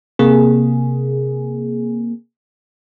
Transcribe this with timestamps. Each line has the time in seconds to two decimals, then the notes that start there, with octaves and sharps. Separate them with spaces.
0.19 C3 A#3 G#4